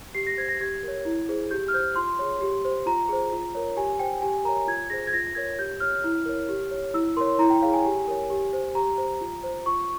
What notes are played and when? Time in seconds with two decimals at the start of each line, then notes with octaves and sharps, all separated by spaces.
0.15 G4 C7
0.27 A#6
0.37 C5 G#6
0.49 A#6
0.60 G4 G#6
0.83 A#4 C#5
1.05 E4
1.29 G#4 C5
1.51 G4 G6
1.68 F6
1.74 C5 G6
1.96 F4 C6
2.19 G#4 C#5
2.41 G4
2.65 C5
2.86 F4 A#5
3.09 G#4 C5
3.32 F4
3.55 A#4 C#5
3.77 G4 G#5
4.00 C5 G5
4.22 G4 G#5
4.45 A#4 C#5 A#5
4.67 F4 G#6
4.90 G#4 C5 A#6
5.07 G#6
5.13 F4 A#6
5.35 A#4 C#5 G#6
5.59 G4 G6
5.80 C#5 F6
6.04 E4
6.26 A#4 C#5
6.49 G4
6.71 C#5
6.94 E4 E6
7.17 A#4 C#5 C6
7.39 E4 A#5
7.50 G5
7.62 G#4 C#5 F5
7.73 G#5
7.85 G4
8.08 A#4 C#5
8.30 G4
8.53 C5
8.75 G4 A#5
8.98 C5
9.21 F4
9.43 C5
9.66 F4 C#6